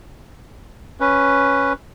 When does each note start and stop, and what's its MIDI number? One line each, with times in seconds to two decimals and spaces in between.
1.00 1.73 61
1.00 1.73 71